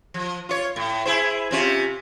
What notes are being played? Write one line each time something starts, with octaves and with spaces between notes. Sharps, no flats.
F3
F4 C#5
A2
E4 G#4 C5
C3 C#4 F4